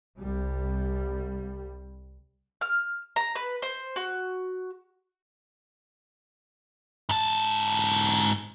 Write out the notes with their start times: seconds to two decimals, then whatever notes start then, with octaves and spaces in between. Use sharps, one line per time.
0.20 C2 G3
2.61 F6
3.16 A#5
3.35 B4
3.62 C5
3.96 F#4
7.09 G#2 A5